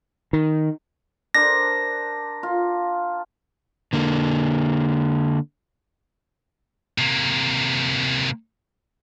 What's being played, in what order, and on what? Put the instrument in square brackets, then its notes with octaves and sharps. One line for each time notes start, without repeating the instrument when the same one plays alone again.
[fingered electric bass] D#3
[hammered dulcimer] D4 A#4 C5 [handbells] A#6
[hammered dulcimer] F4
[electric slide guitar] D3 A#3
[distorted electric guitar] C3 A#3